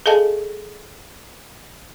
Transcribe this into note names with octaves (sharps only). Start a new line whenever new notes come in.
G#4 A4 D#5 F5 G#5 A5